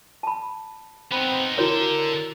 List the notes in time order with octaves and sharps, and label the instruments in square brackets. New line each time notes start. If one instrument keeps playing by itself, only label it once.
[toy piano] A5 B5
[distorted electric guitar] B3 D#4 [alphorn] C4 [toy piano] B5
[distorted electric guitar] D3 A4 [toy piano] E4 F#4 C#5 [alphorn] A#4